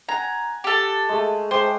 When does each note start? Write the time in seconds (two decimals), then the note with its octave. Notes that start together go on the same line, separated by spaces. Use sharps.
0.09 F#5 G#5 A#5
0.64 G4 A4
1.09 G#3 A3
1.51 G#3 C5 G5 D6